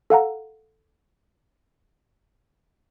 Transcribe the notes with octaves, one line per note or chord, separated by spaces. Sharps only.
A4 F5 F#5 A#5